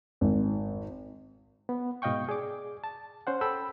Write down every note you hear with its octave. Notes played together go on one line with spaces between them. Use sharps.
G#1
B3
G#2 B2 D#5 F5 G5 C#6
G#4 D5 D6
A5
C#4 C5 F#5
A4 G5 B5 E6